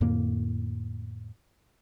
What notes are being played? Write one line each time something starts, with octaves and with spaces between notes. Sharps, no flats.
F2 A2 D3 A#3